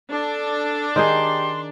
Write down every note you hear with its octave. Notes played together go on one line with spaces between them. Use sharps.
D4 A4
D#3 D#4 G4 G#4 C6